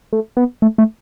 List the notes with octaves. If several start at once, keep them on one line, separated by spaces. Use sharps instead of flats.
A3
B3
A3
A3